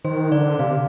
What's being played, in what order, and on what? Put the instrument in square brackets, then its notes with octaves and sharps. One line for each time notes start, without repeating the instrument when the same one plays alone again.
[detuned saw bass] D#3 [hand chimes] C5
[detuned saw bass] D3 [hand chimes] D5
[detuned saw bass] C3 [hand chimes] F5